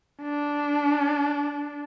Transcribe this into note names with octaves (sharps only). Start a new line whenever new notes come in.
D4